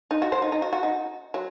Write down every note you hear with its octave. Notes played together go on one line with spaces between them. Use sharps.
D#4
F#4
C5
D#4
D#4
F#4
F#4
D#4
F#3